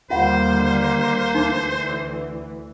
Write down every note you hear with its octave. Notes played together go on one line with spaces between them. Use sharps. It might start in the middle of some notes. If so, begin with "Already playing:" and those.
D#2 D3 G3 A#3 F4 C5 F5 F#5
D2 E3 D#4